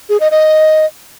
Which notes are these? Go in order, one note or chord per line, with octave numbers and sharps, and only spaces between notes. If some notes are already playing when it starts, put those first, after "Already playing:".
G#4
D#5
D#5